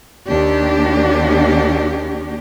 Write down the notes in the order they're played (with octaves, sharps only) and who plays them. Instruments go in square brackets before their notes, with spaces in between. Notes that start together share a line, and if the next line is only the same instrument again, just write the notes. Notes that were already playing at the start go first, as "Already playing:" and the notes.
[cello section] D#2 D4 G4